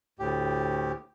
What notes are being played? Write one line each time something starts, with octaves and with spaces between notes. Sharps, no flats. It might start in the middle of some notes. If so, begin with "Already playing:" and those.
D2 A2 G4